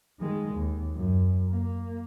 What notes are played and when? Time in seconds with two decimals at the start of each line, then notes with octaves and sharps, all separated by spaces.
0.19 D#3 G#3
0.54 D#2
0.95 F#2
1.50 A#3